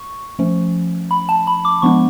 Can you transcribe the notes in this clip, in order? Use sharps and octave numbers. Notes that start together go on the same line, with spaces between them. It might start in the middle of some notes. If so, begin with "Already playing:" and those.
Already playing: C#6
F3 A3 C#4
B5
A5
B5
D6
F3 G#3 B3 D4 C#6